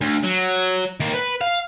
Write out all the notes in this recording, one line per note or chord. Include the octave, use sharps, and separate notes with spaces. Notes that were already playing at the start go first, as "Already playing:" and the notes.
D2
F#3
D#3 A#3
B4
F5